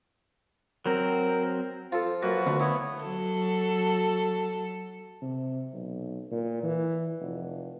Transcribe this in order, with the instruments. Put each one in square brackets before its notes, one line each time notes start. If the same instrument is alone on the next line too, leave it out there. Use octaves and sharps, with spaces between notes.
[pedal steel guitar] F#3 C4 [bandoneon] A#4
[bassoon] F3 [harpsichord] F4 A4
[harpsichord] F#2 A#3 A#4 [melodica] F#4 B4
[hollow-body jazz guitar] D2
[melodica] B3 C#5 [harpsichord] E4
[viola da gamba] F#3 A4
[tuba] C3
B1
A#2
E3
F1